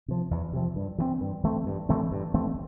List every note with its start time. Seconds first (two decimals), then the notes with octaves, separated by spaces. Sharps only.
0.08 C3 F3
0.31 E2
0.53 C3 F3
0.76 G2
0.98 E3 A3 C4
1.21 G2
1.43 E3 A3 C4
1.66 G2
1.89 E3 A3 C4
2.12 G2
2.34 E3 A3 C4